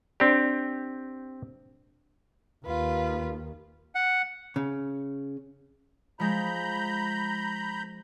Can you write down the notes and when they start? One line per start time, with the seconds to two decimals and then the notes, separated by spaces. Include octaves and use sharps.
0.20 C4 D4 G4 D5
2.66 D#2 F4 B4
3.95 F#5
4.56 C#3
6.20 F3 G#3 A#5 B5 G6